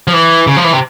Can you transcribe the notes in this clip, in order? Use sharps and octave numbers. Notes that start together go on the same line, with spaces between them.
F3
E3
C#3
F3
E3
C3